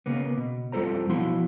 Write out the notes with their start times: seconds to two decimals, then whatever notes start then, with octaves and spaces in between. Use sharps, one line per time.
0.06 C#3 A#3 B3
0.38 B2
0.72 F2 G3 F4 A4 C5 A#5
1.09 B1 F3 B3 E4 F#4 C6